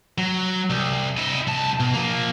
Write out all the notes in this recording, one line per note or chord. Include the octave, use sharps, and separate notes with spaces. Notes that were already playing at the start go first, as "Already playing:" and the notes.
F#3
C2
E4 D#5
C2 A5
B2
F3 A#3